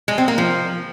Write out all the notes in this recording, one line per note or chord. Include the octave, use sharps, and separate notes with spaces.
G#3
C4
A#3
F3